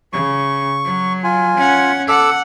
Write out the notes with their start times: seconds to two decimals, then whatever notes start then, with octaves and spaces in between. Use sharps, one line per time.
0.13 C#3 C#6
0.85 F#3
1.24 F4 G#5
1.57 C#4 F#5
2.08 A4 F#5 D6 E6